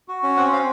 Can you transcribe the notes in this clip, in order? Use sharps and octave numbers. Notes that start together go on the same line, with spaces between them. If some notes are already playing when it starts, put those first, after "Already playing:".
F#4
C#4
C4 F#5
C4 F5